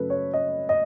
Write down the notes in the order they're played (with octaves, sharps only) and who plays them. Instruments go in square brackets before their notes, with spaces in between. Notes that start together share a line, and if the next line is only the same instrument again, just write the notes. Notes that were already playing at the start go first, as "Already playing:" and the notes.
Already playing: [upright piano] F#2 C#3 F#3 A3 A4 B4
C#5
D#5
D#5